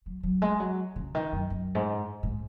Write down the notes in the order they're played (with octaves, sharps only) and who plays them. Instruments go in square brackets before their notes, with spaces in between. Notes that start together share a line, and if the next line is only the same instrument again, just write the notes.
[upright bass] F#3
F#3
G#3
F#3
C#3
D#3
F#2
F#2
G#2
G#2